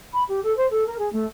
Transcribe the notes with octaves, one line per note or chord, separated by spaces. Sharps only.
B5
G4
A4
C5
A4
A#4
G#4
A3